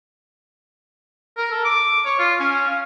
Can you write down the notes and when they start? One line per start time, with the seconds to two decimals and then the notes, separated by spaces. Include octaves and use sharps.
1.37 A#4
1.51 A4
1.65 D6
2.06 C#5
2.19 F4
2.40 C#4
2.67 F5